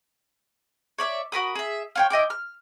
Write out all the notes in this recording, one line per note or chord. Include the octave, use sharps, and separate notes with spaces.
C#5 D5 E5
F#4 A#4 B5 D#6
G#4 E5
F4 C#5 G5
E4 D#5 G5 D6
F6